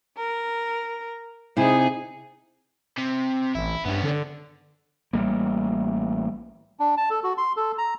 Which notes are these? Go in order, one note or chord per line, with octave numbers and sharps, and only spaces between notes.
A#4
C3 D#4 E4 G#4 G#5
C3
A1 E4
G2 B3 C#4
D3
A1 G3 A#3
D4
A5
A4
F#4
C6
A4
A#5